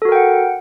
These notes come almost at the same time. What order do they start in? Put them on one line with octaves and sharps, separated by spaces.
A4 F#4 A#4 G5 F#5